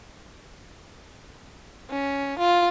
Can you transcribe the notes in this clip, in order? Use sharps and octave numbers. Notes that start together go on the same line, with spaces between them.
C#4
F4